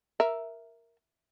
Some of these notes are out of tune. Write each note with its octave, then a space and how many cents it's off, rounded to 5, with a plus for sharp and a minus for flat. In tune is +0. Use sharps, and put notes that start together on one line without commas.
A#4 +0 E5 +0